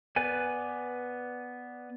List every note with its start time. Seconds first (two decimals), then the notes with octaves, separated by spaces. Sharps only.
0.16 B3 B4 D5 G#5